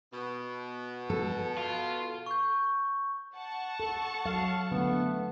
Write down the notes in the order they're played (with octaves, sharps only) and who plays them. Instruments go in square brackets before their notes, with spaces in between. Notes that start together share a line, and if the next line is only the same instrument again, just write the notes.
[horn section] B2
[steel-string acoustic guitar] A4
[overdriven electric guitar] F4
[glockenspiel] C#6 G6
[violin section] F#5 A5 C#6
[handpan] A4
F#3 A4 F5
[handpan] D3 A3 [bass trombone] B3